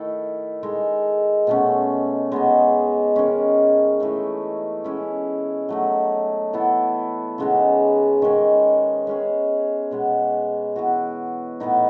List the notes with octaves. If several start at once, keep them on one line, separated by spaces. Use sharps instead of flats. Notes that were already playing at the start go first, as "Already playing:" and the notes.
Already playing: D#3 A3 E4 A4
G#3 D#4 A4
B2 A3 C#4
G#3 B3 D#4
D#3 G#3 C#4
E3 A3 D#4
G#3 C#4 E4
F#3 A3 D#4
E3 B3 E4 A4
C#3 G#3 B3 D#4
D#3 G#3 C#4
G#3 C#4 G#4
B2 G#3 B3
E3 B3 F#4
A2 E3 B3 D#4